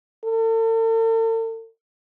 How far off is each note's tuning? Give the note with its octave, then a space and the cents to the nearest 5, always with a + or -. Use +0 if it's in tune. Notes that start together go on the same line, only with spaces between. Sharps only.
A4 +45